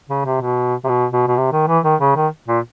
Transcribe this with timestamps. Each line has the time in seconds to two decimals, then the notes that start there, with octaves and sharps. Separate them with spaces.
0.09 C#3
0.25 C3
0.41 B2
0.84 C3
0.89 B2
1.13 B2
1.27 B2
1.37 C3
1.53 D#3
1.68 E3
1.85 D#3
2.01 C#3
2.16 D#3
2.48 A#2